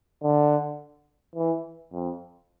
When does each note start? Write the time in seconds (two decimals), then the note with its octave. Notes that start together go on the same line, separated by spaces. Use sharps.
0.23 D3
1.36 E3
1.93 F2